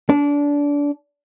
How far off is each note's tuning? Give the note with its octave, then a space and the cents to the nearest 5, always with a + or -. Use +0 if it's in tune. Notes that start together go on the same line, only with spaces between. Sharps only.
D4 -25